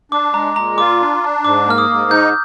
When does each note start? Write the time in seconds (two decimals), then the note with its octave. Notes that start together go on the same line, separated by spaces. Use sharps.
0.12 D4 D6
0.34 G#3 A#5
0.56 A#2 A#5
0.78 F4 D6
1.00 D4
1.23 D4
1.45 G#2 D6
1.67 A#3 F6
1.78 D#6
1.89 G#2
2.11 D#4 G6